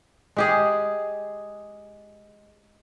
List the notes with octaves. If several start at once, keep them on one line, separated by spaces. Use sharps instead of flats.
G#3 G4 G#4